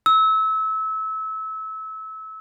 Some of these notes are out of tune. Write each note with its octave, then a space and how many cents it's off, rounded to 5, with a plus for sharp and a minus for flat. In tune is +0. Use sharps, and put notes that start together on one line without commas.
E6 -25